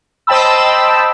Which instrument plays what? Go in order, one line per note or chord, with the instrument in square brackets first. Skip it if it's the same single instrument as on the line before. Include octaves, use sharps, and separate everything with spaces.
[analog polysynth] C5 D#5 G5 A5 B5 E6